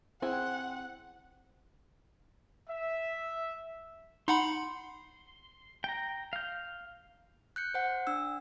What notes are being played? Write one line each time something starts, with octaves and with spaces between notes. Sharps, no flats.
C4 E4 G#4 C5 F#5
E5
D#4 F#5 B5 C6
G5 A#5
F5 G6
F#6 G6 C#7
C5 F#5
D4 E6